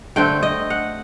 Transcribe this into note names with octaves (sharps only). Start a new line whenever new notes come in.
D3 A3 C4 G5
D#5
F#5